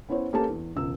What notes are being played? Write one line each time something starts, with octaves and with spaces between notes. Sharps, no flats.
B3 C#4 E4 C5 C#5
A#3 C#4 G4 A4 B4 A5
E2
E1 C#2 E6